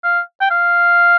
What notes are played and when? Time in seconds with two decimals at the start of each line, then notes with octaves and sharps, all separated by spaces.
0.04 F5
0.41 G5
0.50 F5